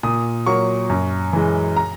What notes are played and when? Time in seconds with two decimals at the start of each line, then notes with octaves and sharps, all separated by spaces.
0.03 A#2 D#6
0.46 F#3 A#3 C#6
0.90 F#2
1.33 E3 G#3
1.76 A#5